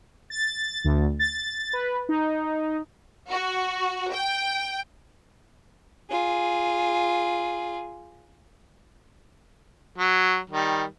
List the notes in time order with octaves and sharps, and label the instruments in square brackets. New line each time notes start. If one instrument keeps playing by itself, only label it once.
[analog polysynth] A6
D2
A6
B4
D#4
[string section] F#4
G5
[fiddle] F4 G#4
[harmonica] F#3
D#3 G3